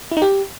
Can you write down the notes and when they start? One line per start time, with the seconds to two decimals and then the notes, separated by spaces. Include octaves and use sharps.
0.12 E4
0.17 D#4
0.22 G4